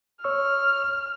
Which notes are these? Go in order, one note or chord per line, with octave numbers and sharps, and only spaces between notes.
C#5 C#6 E6 F6